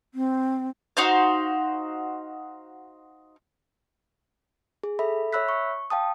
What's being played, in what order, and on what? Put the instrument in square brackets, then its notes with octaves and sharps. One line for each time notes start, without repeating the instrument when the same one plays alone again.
[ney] C4
[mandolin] D#4 F#4 C5 F5
[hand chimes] G#4
A4 E5 B5
C#5 E5 B5 E6 F#6 B6
C#6
F5 G5 A5 D#6